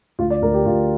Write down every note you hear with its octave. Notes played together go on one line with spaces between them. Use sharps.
D2 F4
D5
D2 A#4
G4
D2 F4